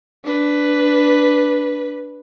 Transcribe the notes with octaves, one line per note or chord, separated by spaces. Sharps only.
D4 B4